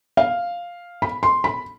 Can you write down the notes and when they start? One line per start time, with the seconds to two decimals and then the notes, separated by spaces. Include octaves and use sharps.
0.17 F5
1.02 B5
1.23 C6
1.44 B5